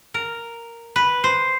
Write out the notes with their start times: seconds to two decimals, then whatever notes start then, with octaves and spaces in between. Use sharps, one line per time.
0.14 A#4
0.96 B4
1.24 C5